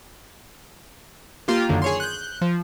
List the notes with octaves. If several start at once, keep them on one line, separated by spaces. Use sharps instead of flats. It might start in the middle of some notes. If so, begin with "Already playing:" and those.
A#3 F4 G4
F#2 D3 D#3 A#3
G#4 C#5 C6
F#6 G6
F3